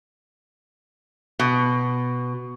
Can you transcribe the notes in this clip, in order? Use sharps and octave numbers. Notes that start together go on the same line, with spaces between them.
B2